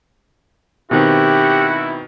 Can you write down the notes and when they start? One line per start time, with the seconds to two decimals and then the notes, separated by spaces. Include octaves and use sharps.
0.91 B2 D#3 C4 E4 F#4 G4